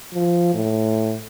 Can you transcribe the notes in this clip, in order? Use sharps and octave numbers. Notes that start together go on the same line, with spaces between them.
F3
A2